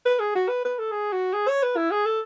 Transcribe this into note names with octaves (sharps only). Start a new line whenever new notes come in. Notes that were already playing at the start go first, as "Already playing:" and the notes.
B4
G#4
F#4
B4
B4
A4
G#4
F#4
G#4
C#5
B4
E4
G#4
A4